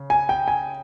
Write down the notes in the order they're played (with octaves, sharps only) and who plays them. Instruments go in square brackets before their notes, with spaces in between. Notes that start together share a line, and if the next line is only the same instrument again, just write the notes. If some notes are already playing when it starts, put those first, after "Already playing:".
Already playing: [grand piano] C#3
G#5
G5
G#5